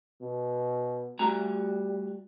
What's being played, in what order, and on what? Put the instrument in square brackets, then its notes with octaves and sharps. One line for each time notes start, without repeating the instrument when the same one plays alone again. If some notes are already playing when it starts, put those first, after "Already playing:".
[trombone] B2
[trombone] G3 [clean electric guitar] A3 F#4 A#5